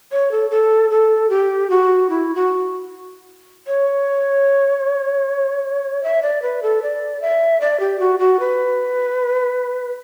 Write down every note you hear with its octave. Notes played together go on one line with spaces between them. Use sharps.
C#5
A4
A4
A4
G4
F#4
E4
F#4
C#5
E5
D5
B4
A4
D5
E5
D5
G4
F#4
F#4
B4